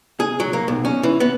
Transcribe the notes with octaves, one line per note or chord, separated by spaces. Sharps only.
G#4
F#3
A#3
B1
C#4
E3
B3